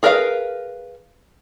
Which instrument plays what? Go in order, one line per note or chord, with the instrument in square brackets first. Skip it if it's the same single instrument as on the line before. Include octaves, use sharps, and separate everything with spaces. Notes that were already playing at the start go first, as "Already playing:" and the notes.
[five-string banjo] G#4 A#4 B4 D#5 F5